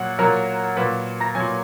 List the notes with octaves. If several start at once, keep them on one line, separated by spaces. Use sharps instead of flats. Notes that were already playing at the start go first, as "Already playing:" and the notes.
Already playing: A#2 F#3 F#5 F#6
A#2 F#3 A#4 A#5
A#2 F#3 B4 B5
A#5 A#6
A#2 F#3 G#5 G#6